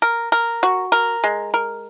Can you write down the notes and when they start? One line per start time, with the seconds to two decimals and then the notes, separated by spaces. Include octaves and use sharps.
0.02 A#4
0.32 A#4
0.63 F#4
0.92 A#4
1.24 G#3
1.54 A#4